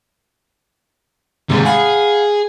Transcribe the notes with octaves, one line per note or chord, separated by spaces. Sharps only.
G#2 C3 D#3 G3
G#4 F5 F#5 B5